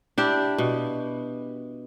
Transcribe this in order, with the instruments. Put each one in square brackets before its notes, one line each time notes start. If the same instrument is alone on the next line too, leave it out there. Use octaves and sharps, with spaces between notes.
[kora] D4 E4 G4
B2